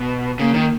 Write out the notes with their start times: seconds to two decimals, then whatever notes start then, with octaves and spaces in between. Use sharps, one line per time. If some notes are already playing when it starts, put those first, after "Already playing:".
Already playing: B2
0.39 C#3 A#3
0.54 D#3